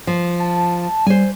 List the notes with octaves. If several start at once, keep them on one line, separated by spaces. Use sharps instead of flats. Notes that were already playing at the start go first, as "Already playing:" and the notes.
F3
A5
G3 C5 G#5